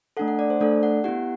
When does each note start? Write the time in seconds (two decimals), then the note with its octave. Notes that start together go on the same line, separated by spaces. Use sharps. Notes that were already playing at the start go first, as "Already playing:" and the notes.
0.17 A3 D4 A4 F#5
0.28 F#5
0.39 D5
0.50 C5
0.61 A3 D4 A4 D5
0.83 F#5
1.04 B3 E4 G4 F#5